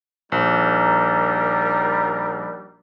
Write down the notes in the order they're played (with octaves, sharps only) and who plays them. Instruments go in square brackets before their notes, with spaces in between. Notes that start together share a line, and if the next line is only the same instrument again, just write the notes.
[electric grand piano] A#1 [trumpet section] G3 D#4 A#4